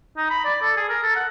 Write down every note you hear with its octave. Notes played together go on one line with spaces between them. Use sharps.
D#4
B5
D5
A4
G#4
A#4
A4
F#5